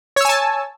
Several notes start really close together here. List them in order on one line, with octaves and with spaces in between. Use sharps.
C#5 E6 G#5 A5